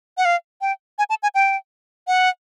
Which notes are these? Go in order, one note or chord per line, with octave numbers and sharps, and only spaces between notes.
F#5
F5
G5
G#5
A5
G#5
G5
F#5